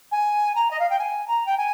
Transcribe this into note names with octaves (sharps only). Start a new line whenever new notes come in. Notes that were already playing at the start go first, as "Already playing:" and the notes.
G#5
A#5
D#5
F5
G5
G#5
A#5
G5
G#5